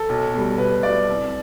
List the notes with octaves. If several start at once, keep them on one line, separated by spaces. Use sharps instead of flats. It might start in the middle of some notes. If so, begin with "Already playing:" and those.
Already playing: A4
B1
B2 G3
B1 B4
B2 G3 D5
C2